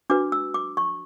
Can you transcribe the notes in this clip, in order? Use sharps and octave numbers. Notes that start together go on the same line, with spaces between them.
D4 F#4 B4 D6
E6
D6
C#6